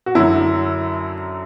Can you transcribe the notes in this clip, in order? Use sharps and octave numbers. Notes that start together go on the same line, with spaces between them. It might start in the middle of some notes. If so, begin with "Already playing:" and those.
F#4
F#2 D3 F#3 E4